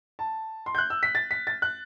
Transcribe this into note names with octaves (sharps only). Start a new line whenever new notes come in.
A5
C6
G6
F#6
E6
B6
A6
B6
A6
F#6